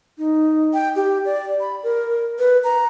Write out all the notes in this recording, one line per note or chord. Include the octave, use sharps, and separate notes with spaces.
D#4
G5
G4
D5
B5
A#4
B4
A#5